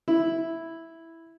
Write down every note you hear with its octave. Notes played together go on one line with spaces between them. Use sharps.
E4